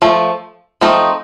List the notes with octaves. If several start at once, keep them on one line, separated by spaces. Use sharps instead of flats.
F3 A3
F3 A3 C4 D#4